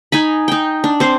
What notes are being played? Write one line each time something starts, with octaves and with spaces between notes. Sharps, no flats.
D#4 G#5 B5
D#4 G5
D4
C4 C5